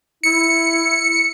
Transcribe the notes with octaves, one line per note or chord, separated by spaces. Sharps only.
E4 C#7